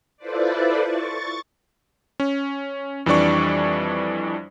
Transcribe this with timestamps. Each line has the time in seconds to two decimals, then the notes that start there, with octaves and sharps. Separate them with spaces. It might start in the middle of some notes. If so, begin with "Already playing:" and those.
0.17 E4 F4 A4 B4 C5 D5
0.86 C#6 A6
2.20 C#4
3.06 F2 E3 G3 D4 D5 C#6